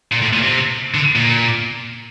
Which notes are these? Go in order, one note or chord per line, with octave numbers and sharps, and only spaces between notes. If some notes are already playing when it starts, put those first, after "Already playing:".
A#2
A2
A#2
C3
D3
A#2